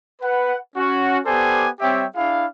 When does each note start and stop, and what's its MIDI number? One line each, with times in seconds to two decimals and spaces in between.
0.21 0.55 71
0.21 0.55 78
0.76 1.18 61
0.76 1.18 66
1.26 1.67 59
1.26 1.67 67
1.26 1.67 69
1.26 1.67 72
1.26 1.67 74
1.26 1.67 80
1.80 2.05 55
1.80 2.05 60
1.80 2.05 67
1.80 2.05 73
1.80 2.05 76
1.80 2.05 79
2.16 2.44 62
2.16 2.44 64
2.16 2.44 68
2.16 2.44 77